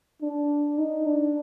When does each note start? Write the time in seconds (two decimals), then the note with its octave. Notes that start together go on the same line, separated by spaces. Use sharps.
0.22 D4
0.78 D#4
1.06 D4